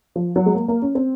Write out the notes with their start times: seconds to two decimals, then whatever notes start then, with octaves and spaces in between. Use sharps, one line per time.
0.16 F3
0.36 F#3
0.46 G#3
0.55 A#3
0.68 A#3
0.82 C#4
0.95 C4